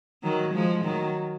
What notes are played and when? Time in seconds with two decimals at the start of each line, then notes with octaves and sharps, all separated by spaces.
0.23 D#3 F#3
0.54 F3 G#3
0.84 D#3 F#3